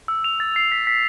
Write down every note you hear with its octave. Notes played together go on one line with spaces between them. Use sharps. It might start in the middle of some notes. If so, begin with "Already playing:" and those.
E6
F7
A6
C7
B6
B6